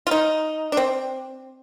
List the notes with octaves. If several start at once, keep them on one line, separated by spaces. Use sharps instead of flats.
F4
D#4
D4
C4